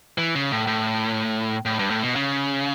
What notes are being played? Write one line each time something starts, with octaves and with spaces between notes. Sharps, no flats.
E3
C#3
A2
A2
A2
G2
A2
B2
C#3